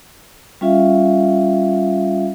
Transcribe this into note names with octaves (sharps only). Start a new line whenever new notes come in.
G3 C#4 F4 E5 F5